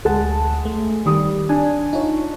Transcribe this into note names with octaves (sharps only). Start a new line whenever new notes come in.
D2 G#3 F#5 A5
A3
D#3 G3 D#6
D4 G#5
D#4 F4 C#5